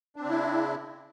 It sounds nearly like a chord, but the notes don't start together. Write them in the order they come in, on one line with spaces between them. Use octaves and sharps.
D4 C4 C#3 E4